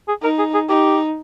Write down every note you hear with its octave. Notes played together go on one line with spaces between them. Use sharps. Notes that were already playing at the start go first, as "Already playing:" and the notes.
G#4
D#4 A#4
G#4
G#4
D#4 G4